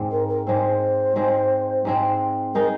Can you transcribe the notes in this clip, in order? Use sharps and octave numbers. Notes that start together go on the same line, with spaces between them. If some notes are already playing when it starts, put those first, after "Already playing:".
Already playing: G#2 G#3 C4
A#4
A#4
G#2 G#3 C4 C5
G#2 G#3 C4
G#2 G#3 C4
G#3 D#4 A#4